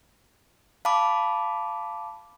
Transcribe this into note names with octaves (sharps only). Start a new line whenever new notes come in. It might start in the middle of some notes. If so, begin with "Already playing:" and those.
F5 A5 B5 D6